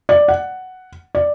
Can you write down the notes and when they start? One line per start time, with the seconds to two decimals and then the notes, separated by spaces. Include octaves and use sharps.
0.09 D5
0.28 F#5
1.15 D5